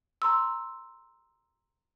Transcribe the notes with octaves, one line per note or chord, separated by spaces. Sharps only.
A#5 C6 E6